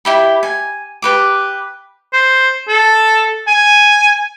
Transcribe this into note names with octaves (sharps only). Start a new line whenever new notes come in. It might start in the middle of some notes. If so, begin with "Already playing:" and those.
E4 G4 B5
G#5
G4 B4 D6
C5
A4
G#5